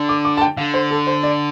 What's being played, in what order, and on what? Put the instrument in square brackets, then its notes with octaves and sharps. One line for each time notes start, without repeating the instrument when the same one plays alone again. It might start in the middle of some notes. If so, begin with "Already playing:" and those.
Already playing: [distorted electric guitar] D3
[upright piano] D6
D6
A5
G5
[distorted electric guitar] D3 [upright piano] F5
[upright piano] C5
A4
C5
D5